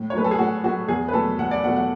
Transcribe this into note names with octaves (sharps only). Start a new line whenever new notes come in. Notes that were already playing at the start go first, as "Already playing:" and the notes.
Already playing: A2
C#5
F#3 A3 B4
A4
G#4
A2 F#4
F#3 A3 F#4
E2 G#4
B4
B2 F#3 A3 A4
E2 F#5
D5
B2 F#3 A3 F#5
F#5